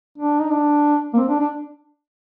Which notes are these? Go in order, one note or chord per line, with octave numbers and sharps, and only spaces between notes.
D4
D#4
D4
A#3
C4
D4
D4